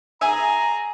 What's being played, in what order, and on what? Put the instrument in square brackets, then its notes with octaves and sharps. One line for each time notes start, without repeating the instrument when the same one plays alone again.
[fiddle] G#4 [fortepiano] E5 G#5 [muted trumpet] A#5